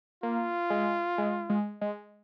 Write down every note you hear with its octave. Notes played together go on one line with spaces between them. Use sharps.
A#3 F4
G#3
G#3
G#3
G#3